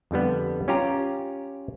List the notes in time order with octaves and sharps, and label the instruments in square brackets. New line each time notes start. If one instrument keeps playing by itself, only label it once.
[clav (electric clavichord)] F2 D3 G3 B3
C#4 F4 G4 A#5